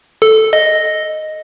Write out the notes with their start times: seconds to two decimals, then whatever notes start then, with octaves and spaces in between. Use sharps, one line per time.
0.22 A4
0.53 D#5